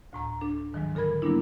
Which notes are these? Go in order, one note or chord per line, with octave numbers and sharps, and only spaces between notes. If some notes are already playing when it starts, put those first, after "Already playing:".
D2 A2 A#5
D4 A4
G#2 D#3 F3 F#3 G#3
D3 A4 A#4 B5 G#6
F#3 G3 A#3 B3 D4 E4